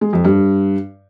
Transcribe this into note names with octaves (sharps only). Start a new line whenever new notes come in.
G#3
F2
G2